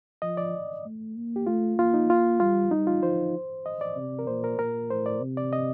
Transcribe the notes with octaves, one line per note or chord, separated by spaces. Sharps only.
F3 D#5
D5
A3
A#3
G4
A3 F4
A#3 F4
D#4
F4
G3 F4
G3 D#4
F4
F3 C5
D#5
D5
C3
A#4
A#2 C5
A#4
A#2 A#4
A2 C5
D5
C3
D5
D#5